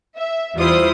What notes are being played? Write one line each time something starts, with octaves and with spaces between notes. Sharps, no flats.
E5
E2 G3 E4 F4 C5 D#6